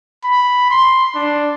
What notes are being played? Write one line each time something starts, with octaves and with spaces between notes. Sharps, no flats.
B5
C6
D4